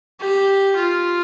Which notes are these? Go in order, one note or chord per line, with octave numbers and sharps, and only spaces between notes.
G4
F4